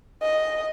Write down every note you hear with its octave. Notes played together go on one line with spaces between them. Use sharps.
D#5